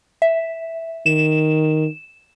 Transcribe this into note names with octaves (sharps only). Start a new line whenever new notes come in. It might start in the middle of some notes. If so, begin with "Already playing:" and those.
E5
D#3 E7